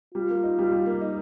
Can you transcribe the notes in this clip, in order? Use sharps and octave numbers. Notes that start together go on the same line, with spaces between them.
G3 F4
A#3
D#4
G3
G3
A#3
D#4